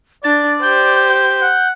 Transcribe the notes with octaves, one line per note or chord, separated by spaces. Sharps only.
D4 D5 A6
G4 C5 G6
F#5